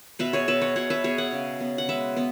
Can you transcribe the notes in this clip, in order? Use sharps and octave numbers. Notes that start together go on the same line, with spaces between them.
B2 B4 E5
G#4 C#5
B2 B4 E5
C#5 F#5
B2 C#5 F#5
B4 E5
B2 G#4 C#5
C#5 F#5
C#3
B3
F#5
G#3 B4 E5
B3